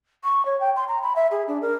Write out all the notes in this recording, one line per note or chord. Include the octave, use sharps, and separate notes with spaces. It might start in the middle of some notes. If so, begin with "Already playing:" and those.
C#6
C#5
G5
C6
A#5
B5
E5
G#4
D4
A#4